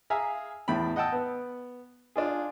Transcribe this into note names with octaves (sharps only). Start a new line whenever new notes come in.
G#4 E5 F5 G#5 A#5
E2 A2 G5 B5
D#5 F#5 G5 A5 E6
B3
D4 F4 G#4